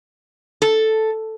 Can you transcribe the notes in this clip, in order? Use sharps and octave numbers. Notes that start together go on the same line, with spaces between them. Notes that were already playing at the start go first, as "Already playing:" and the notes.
A4